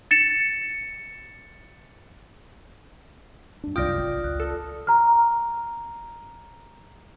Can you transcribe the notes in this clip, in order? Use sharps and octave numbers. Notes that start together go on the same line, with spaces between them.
A6 C#7 E7
F#2 D4
C2 F#2 F4 D5 G5 D#6 F6 A#6
G#1
C#2 F#6
A4
A#5 F6